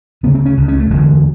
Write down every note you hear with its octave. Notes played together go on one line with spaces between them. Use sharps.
D2 C#3 B3
C4
C#4
C#2 C#3
C#4
A3
E1 D2 D3 G#3